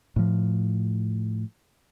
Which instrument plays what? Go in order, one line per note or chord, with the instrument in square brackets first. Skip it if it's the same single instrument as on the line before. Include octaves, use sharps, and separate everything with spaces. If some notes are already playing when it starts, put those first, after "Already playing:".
[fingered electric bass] A2 F3